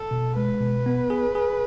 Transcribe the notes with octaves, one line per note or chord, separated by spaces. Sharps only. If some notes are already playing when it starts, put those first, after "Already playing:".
Already playing: A4
B2
G#3 B4
B2
B3
G#4
G#4